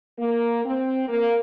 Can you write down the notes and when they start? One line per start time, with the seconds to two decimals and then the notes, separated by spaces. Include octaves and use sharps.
0.19 A#3
0.65 C4
1.08 A#3